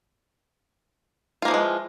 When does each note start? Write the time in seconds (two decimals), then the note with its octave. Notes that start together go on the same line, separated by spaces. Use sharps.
1.42 F4
1.45 A#3
1.48 F3
1.51 E3
1.54 G#3